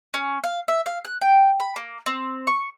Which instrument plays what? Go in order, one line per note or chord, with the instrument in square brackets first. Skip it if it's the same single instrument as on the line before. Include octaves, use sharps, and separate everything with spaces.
[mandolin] C#4
F5
E5
F5
F#6
G5
B5
A#3
C4
C#6